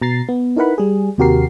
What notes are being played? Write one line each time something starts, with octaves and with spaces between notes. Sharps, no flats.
B2 A#5 A6 C7
B3
D#4 E4 A#4 B4 F#5 B5
G3 G#4
D#2 C3 F#4 G4 A#4 C7